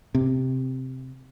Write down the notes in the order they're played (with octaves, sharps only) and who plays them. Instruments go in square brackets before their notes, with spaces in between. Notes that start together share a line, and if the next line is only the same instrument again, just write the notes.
[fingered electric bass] C3